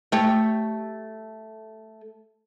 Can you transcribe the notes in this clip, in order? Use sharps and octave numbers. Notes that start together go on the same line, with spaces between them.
A3 G4 C#5